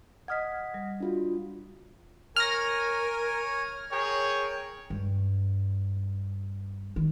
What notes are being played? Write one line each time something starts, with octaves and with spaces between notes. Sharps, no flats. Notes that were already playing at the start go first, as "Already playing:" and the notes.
D#5 F#5 D#6 F6 G#6 B6
G3
D4 F4 F#4
A#4 C#5 G#5 F6 A#6
G#4 A#4 C#5 G5
G2
D#3